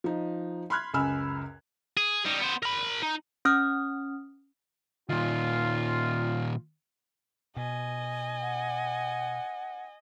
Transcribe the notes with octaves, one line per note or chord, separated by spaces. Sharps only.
F3 D#4
B5 C6 F6 F#6 G#6
C#2 F#2 G#5 B5 E6 F6
G#4
G3 D#4
B3 C5
A#4 B5
D#4
C#4 D#6 F6
A#2 D#3 F4
B2 D#5 G#5
F#5